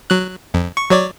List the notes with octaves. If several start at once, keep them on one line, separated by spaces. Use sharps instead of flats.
F#3 F#6
F2
C#6
F#3 C#5 D5